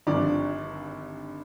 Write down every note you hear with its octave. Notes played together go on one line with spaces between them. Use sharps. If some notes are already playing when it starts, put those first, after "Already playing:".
G#1 G2 D3 F3 D5